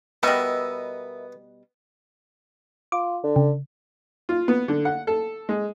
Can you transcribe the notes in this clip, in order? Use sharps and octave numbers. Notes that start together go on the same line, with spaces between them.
B2 G3 B3 A#4 D#5 E5
F4 D6
D3
C#3
F4
B3
D3
F#5
A4
G#3